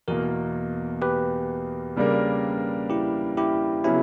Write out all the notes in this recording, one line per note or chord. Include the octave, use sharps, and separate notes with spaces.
E2 B2 A#3 F#4 A#4
G4 B4
C#3 G3 A#3 D4 A#4
E4 G4
E4 G4
C#3 F#3 B3 C#4 E4